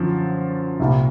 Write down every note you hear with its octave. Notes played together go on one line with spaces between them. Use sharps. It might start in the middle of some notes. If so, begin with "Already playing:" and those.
Already playing: F#2 D3 F3
C2 A#2 G3